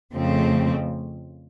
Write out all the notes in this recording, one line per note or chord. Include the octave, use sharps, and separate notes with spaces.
F2 C#3 F3 A3 C4